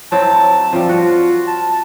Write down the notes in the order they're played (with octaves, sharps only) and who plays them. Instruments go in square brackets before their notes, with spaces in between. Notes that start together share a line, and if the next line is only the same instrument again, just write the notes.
[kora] F#3 C4 E4 [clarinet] A5
[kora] F3 G3 [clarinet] C4
[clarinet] F4 [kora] F#4
[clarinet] A5